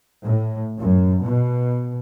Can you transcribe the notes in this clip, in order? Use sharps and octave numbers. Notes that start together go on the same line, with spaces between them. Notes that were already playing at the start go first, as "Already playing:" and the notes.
A2
F#2
B2